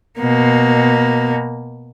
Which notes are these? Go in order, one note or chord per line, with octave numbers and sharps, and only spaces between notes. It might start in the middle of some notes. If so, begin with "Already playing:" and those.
B2 A#3